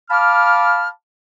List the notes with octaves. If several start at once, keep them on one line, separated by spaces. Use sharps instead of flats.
F5 A5 B5 D6 F6